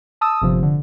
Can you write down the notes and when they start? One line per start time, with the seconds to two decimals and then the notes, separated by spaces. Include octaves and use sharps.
0.21 A5 D#6 E6
0.42 G1 C3 F3
0.63 D3